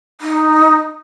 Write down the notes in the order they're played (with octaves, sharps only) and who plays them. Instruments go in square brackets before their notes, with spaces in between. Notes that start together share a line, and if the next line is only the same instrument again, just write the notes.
[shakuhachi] D#4